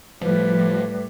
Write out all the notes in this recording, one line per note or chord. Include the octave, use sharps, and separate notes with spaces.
A2 F3 G3 B4